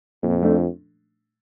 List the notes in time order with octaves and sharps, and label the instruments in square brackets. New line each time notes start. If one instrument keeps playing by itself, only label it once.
[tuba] F2 [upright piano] A#2
[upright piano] F3 A3 D4